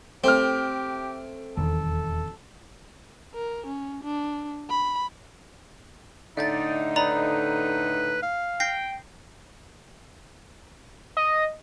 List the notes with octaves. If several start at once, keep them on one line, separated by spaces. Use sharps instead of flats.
A3 C4 G4 F6
D#1 E2 D#3 A4
A#4
C#4
D4
B5
A2 D3 D#4 D5 E5 G6 A6
B4 D5 A#5 B5
F5
G5 G6 A#6 C7
D#5